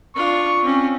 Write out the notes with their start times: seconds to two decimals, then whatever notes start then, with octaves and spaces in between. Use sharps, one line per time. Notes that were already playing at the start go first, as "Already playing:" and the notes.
0.16 D4 F4 C#6
0.62 C4 C#4